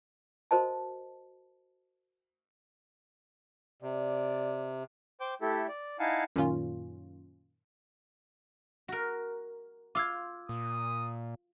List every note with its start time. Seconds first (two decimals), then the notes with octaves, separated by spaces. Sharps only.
0.51 F#4 A#4 C5 D#5 A5
3.82 C3 D5
5.20 C5 G5 D6 G6
5.42 A3 E4 G4 A4
5.68 D5
5.99 D#4 E4 F5 F#5 G#5 A5
6.36 F#2 A#2 D#3 C#4 F4
8.88 F#4 A#4
9.95 F4 F5 D6 E6 G#6
10.49 A#2 D#6